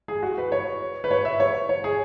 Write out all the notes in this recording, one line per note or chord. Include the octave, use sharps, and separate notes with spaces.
G#4
F#4
B4
C#5
B4
C#5
E5
C#5
C#5
G#4